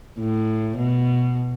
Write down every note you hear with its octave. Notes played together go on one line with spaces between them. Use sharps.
A2
B2